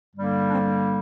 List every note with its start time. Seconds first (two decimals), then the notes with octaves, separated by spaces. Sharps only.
0.15 G2 D3 G3 A#3
0.47 D4
0.54 C4